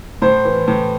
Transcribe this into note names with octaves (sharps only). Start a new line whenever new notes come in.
A2 C5
E3
A2